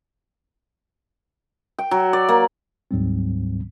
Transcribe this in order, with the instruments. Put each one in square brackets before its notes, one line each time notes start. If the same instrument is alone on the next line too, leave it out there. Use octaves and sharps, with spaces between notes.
[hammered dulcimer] G5
F#3
D5
A#3
[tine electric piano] D2 G#2 F#3 G3 C4